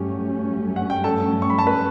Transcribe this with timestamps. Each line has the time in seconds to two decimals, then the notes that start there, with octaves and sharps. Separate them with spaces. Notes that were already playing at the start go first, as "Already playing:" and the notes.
Already playing: G2 F#3 A3 C#4 G4
0.76 F#5
0.90 G5
1.04 A4 A5
1.42 C#6
1.50 B5
1.58 A5
1.66 B4 B5